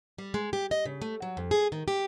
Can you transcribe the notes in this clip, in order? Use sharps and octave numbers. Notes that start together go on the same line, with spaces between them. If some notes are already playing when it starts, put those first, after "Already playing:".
G3
G#3
G4
D#5
C#3
A3
F#3
F2
G#4
D#3
G4